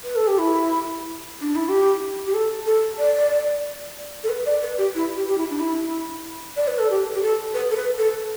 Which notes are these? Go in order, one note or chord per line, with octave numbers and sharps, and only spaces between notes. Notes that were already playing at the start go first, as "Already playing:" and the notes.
B4
A4
G4
E4
D4
E4
G4
G4
A4
A4
D5
A4
B4
D5
B4
G4
E4
G4
G4
E4
D4
E4
D5
B4
A4
G4
G4
A4
B4
A4
B4
A4